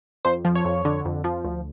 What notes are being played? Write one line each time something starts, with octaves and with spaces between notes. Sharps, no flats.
F2 C5
F3
C#5
F2
D3
F2
F3
D2